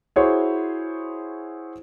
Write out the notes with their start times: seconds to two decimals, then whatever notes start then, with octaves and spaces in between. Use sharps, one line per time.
0.16 E4 F#4 G#4 C5 C#5